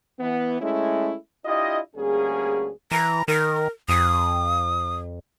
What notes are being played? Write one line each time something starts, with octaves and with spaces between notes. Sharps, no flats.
E3 B3
G#3 A3 C#4 E4
D4 E4 F4 G4 D#5
D2 G3 A#3 C#4 G#4
E3 A#5
D#3 A#4
F2 D#6